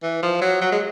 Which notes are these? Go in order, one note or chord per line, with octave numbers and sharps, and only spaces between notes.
E3
F3
F#3
F#3
G#3